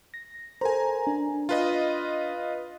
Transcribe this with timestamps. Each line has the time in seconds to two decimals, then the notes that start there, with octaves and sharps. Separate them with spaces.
0.14 A#6
0.61 A4 A#4 C5 G#5 A#5
1.07 D4
1.49 F4 B4 D#5